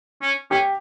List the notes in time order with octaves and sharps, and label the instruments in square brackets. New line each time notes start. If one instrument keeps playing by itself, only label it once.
[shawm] C#4
[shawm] C#4 [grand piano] G4